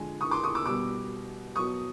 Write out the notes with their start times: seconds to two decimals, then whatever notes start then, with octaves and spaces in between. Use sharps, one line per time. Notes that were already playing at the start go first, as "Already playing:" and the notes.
Already playing: D3 F3 G#3 G#5
0.21 C#6 D#6
0.31 C6 D6
0.44 C#6 D#6
0.55 D6 E6
0.66 B2 G3 D6 E6
1.56 B2 F#3 C#6 D#6